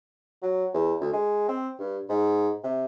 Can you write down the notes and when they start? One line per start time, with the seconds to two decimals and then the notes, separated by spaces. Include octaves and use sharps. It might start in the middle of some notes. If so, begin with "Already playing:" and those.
0.42 F#3
0.74 E2
1.00 D2
1.13 G#3
1.48 C4
1.79 G2
2.09 G#2
2.64 C3